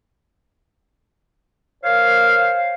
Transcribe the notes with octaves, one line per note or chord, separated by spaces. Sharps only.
A#4 C5 C#5 F5